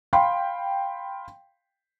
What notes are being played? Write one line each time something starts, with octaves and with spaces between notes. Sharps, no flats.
F5 G5 B5 C6